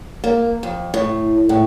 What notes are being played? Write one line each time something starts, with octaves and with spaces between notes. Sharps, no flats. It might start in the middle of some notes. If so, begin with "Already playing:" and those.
A#3
F2
A2
A2